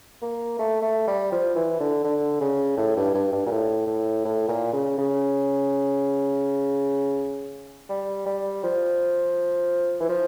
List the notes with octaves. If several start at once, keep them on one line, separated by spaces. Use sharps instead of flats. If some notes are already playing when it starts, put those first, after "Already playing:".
A#3
A3
A3
G3
F3
E3
D3
D3
C#3
A2
G2
G2
G2
A#2
A2
A2
A2
A#2
C#3
C#3
G3
G3
F3
E3
F3